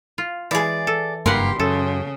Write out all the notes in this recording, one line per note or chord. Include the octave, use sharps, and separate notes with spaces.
F4
E3 G#3 G#4 D5
A4
F#1 G2 A#3 G4 A#4 B4 F#5 C6
F#2 C#3 A4